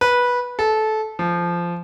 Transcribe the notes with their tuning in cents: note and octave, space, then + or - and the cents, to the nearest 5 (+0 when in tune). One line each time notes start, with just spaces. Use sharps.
B4 -15
A4 -20
F3 -15